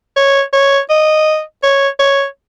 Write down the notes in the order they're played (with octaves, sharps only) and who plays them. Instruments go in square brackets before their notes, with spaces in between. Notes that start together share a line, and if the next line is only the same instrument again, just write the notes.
[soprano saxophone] C#5
C#5
D#5
C#5
C#5